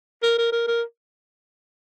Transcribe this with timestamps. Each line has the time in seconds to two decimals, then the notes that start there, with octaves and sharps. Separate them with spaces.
0.23 A#4
0.38 A#4
0.52 A#4
0.67 A#4